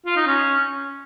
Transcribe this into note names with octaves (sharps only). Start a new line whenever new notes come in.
F4
D#4
C#4